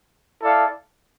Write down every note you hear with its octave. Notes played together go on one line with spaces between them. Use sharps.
E4 A4 D5 F5